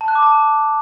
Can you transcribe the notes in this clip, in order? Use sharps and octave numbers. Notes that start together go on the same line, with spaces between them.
A5
F#6
D6
A5